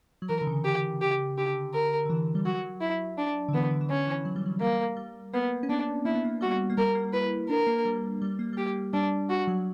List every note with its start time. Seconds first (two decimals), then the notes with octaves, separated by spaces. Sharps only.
0.22 F#3
0.29 E3 A#4
0.41 D3
0.47 C#3
0.65 G4
1.01 G4
1.37 D3 G4
1.73 D3 A#4
2.05 D3
2.10 E3
2.35 G3
2.45 F#3 F#4
2.81 E4
3.18 D4
3.48 D3
3.53 E3 B3
3.71 D3
3.81 E3
3.89 D3 C#4
4.07 E3
4.25 F#3
4.36 G3
4.46 F#3
4.61 G3 A#3
4.97 G3
5.33 A#3 B3
5.63 C#4
5.69 B3 D4
6.05 A#3 E4
6.15 B3
6.24 A#3
6.41 G3 F#4
6.70 A#3
6.77 G3 A#4
6.88 G3
6.95 A#3
7.13 E4 B4
7.49 D4 A#4
7.67 A#3
7.85 G3
8.22 G3
8.39 A#3
8.53 G3
8.57 A#3 G4
8.93 G3 D4
9.29 G3 F#4
9.47 F#3